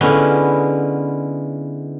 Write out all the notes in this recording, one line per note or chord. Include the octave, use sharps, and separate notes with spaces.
D3 G#3 B3 C#4 E4 F4